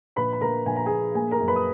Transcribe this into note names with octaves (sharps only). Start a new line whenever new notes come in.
A#1 B4 B5
B5
A#1 A#4 A#5
A#1 G#5
A#5
A#1 G#4 G#5
A#3 G#4 G#5
A#4 A#5
F#2
B4 B5
D#6